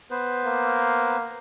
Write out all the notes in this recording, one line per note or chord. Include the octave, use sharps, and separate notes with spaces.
B3 B4 C5
A#3